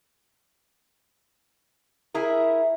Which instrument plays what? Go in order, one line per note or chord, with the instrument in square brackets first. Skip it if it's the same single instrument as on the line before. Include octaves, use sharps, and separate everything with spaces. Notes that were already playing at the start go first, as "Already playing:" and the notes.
[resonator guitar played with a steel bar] E4 G#4 A#4 [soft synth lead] E5